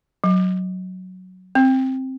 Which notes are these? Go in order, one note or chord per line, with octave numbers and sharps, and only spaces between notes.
F#3
C4